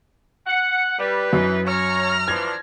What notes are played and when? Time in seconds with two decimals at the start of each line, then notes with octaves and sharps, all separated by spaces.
0.47 F#5
0.99 G3 B4
1.33 F#2 E3 D#4
1.67 C#5 A#5 F6
2.28 E3 F3 D4 G#6